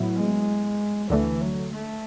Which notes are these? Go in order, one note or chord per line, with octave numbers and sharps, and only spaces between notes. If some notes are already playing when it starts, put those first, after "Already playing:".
Already playing: A2 F#3 B3 E4
G#3
D2 D3 E3 A3
F#3
A3